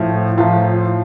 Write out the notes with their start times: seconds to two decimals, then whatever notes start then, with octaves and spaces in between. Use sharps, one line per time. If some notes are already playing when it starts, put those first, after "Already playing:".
Already playing: A2 F3
0.38 A2 F3 F4